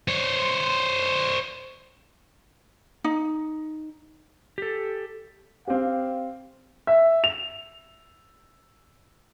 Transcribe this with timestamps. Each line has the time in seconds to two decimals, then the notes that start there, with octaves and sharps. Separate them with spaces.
0.08 C5 C#5
3.04 D#4
4.58 G4 A4
5.68 C4 G4 F5
6.87 E5
7.24 F7